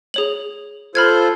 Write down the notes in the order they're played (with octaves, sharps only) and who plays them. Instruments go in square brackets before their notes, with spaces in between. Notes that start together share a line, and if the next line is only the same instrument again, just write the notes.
[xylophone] G#4 C#5 F#7
[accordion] F4 A4 C5 [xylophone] B5 F6 G#6